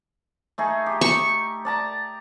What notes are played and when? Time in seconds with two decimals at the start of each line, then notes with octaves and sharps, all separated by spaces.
0.58 A3 D#4 G#4
0.86 G4
1.01 C#6
1.65 D5 A5 A#5